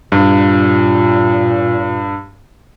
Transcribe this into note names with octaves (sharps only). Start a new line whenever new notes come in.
G2 A#2